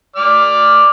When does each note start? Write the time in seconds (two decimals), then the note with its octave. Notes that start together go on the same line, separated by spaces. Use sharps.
0.16 D5 D6 F6